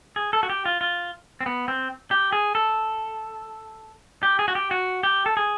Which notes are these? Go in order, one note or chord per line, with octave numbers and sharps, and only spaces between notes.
G#4
A4
F#4
G4
F4
F4
C4
B3
C4
G4
G#4
A4
G4
G#4
F#4
G4
F#4
G4
A4
G#4